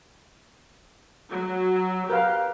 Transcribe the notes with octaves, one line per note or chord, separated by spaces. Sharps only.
F#3
G4 A#4 B4 F5